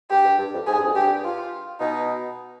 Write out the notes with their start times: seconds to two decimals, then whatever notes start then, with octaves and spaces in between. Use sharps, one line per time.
0.10 G2 G4
0.25 G2
0.39 G2
0.54 F2
0.67 G#2 G#4
0.77 G2
0.85 F2
0.94 G2 G4
1.25 F4
1.80 B2 D#4